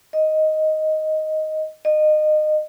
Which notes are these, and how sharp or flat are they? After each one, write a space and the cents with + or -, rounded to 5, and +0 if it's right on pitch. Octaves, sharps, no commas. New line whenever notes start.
D#5 +5
D#5 -25